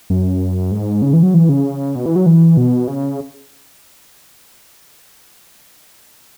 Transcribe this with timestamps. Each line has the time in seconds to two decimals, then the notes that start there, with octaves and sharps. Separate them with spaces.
0.10 F#2
0.71 G#2
1.02 C#3
1.13 E3
1.23 F#3
1.34 E3
1.49 C#3
1.95 B2
2.06 E3
2.16 F#3
2.26 E3
2.57 B2
2.88 C#3